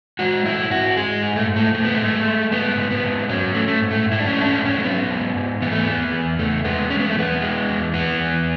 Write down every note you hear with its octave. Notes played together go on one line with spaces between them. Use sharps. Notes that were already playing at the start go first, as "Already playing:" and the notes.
G#3 F#4
G#2 E4
G#2 F#4
G#3 G#4
G#2
A3
G#2
A3
G#2 A3
B3
A3
G#3
G#3
G#2 B3
G#2
B3
G#2
F#3 C#4
A3
A3
G#2
A3
G#2
E4
D4
C#4
A3
D4
C#4
G#2
C#4
A3
F#3 B3
G#2
G#2
E3 B3
A3
E2 B3
E2
E2 A3
G#3 B3
G#3 C#4
B3
A3
E3 B3
G#3
E2
E3 B3
E2